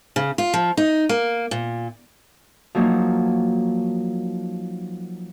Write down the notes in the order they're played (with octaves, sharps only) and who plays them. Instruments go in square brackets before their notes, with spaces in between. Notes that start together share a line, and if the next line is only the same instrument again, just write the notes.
[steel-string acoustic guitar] C#3
F4
F3
D#4
A#3
A#2
[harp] F3 F#3 A#3 D#4